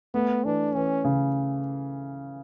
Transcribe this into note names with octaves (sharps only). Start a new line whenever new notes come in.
A3 B3
E3 D4
E3 C#4
C#3